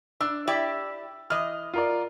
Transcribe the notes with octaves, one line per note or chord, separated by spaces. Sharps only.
D4 E6
E4 G4 D5
E3 D#5 F6
F4 A#4 D5